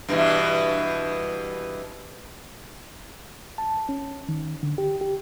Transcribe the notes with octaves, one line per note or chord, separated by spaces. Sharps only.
G2 B2 E3
A5
C#4
D#3
D3
G4
G4